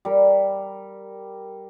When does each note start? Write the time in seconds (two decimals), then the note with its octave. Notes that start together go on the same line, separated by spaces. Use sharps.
0.05 G3 A#4